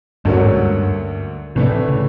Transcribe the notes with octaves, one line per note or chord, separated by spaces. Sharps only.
D2 G2 D3 F#3 A#3 C#4
G#2
G2
A2 C3 E3 A3 D4
C#3